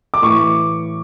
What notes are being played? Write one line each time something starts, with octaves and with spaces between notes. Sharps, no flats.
D6
A2 E3 C#6